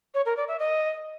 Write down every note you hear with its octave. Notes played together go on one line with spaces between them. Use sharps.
C#5
A#4
D5
E5
D#5